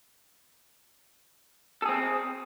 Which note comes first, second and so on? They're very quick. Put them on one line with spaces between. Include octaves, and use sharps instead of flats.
A4 G#4 C4